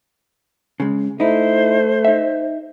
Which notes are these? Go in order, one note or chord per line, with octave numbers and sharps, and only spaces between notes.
C#3 G#3
A3 D#4 E4 C5
D#4 E5